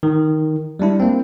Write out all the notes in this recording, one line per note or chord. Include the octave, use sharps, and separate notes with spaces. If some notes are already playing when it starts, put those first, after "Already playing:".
D#3
G3 G#3 D4 E4
A#3 C4